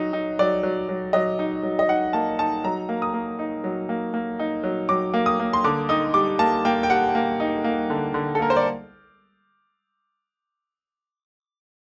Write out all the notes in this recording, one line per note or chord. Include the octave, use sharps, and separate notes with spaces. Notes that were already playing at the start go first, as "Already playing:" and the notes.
Already playing: F#3 D#4
D#4
F#3 D5
F#3
F#3
F#3 D#5
D#4
F#3
D#5
D#4 F#5
A#3 A5
D#4 A5
F#3 A#5
A#3
D#6
A#3
D#4
F#3
A#3
A#3
D#4
F#3
F#3 D6
A#3
D#6
A#3
C6
D3 D6
D#4 D#6
G3 D6
A#3 A5
A#3 G5
G5
G3 F#5
A#3
D#4
A#3
D3
D3
A4
A#3 A#4
C5
D5